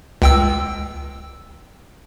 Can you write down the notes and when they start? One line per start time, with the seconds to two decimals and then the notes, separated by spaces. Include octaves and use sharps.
0.22 C#2 G5 E6